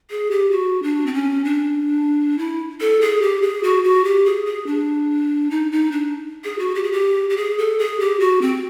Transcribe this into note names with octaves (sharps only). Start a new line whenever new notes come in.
G#4
G4
F#4
D4
C4
C#4
D4
E4
A4
G#4
G4
G#4
F#4
F#4
G4
G#4
G#4
D4
D#4
D#4
D4
G#4
F#4
G4
G#4
G4
G4
G#4
A4
G#4
G4
F#4
C4